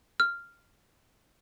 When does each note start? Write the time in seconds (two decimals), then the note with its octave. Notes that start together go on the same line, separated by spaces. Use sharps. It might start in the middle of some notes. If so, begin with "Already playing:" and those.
0.20 F6